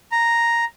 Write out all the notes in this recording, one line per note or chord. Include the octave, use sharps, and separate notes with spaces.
A#5